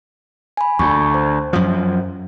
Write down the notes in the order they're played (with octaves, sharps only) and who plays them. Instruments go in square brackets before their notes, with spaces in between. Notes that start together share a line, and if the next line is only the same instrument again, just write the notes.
[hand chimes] G#5 B5
[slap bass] D2 [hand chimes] C#6
[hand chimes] C5
[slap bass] F#2 F3